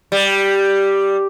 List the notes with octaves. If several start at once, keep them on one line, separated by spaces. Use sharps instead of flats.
G3